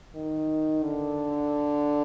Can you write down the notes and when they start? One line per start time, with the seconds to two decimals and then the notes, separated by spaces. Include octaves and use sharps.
0.15 D#3
0.83 D3